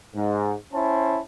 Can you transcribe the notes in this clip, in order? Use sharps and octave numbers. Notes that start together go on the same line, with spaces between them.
G#2
C#4 E4 C5 A5